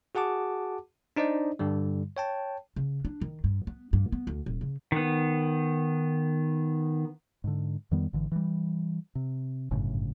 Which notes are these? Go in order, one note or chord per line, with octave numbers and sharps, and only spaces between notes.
F#4 G#4 F#5 A5 D6
D4 D#4 C5 D5 D#5
G2 D3 G3
C#5 G5 A5
C#3
D4
D#3
G2
B3
G2
B3
D2
D#1
C#3
D#3 B3
G#2 D3
F2 D#3 G3 B3
G#1 D3 E3
E3 G3
C3
G1 F#2 A2 C#3